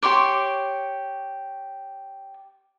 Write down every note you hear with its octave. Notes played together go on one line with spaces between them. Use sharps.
G4 C#5 C6 D6